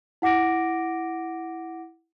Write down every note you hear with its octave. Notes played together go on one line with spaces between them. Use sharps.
E4 F#5 D6 A#6 D7